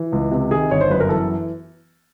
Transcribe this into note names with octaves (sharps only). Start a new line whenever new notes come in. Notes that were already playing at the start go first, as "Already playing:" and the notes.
Already playing: E3
C#2
C3
D#3 G#4
G1 C#5
C5
F#2 B4
A#4
E3 A4